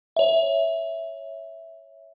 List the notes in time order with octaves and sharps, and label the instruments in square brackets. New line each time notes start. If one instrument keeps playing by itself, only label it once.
[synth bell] C#5 E5